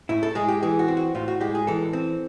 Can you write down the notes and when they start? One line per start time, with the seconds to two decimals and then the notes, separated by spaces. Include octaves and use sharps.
0.09 A2 E4
0.23 A4
0.35 G#3 G#4
0.48 G4
0.63 E3 G#4
0.79 F#4
0.88 C4
0.97 F#4
1.15 A2 F4
1.28 F#4
1.41 G#3 G4
1.55 G#4
1.67 E3 A4
1.93 C4